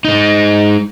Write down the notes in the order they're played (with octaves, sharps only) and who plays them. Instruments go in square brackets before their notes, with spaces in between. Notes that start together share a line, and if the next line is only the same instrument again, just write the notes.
[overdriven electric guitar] G#3 D#4